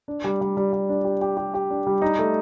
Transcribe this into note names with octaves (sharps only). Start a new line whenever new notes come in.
D4
G3
G3
G3
G3
D4
G4
G4
G4
G4
D4
G3
D#4
A3